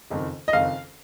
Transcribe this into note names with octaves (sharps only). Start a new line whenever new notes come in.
F#1 F2 D#3
D#5
F#1 F2 D#3 F5